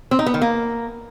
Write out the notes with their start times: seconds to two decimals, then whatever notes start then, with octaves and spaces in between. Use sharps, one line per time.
0.11 C4
0.19 D#4
0.26 B3
0.34 D#3
0.42 A#3